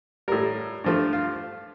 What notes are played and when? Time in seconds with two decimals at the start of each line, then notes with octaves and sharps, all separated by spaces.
0.28 A2 G3 A#4
0.84 G2 F3 A3
1.13 F4